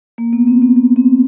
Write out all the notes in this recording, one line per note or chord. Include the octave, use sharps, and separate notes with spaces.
A#3
B3
C4
B3
B3
C4